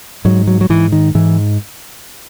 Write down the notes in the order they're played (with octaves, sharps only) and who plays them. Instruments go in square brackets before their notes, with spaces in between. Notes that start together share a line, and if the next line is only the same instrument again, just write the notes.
[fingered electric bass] G#2 F#3
F#3
F#3
G#2 E3
D#3
G#2 E3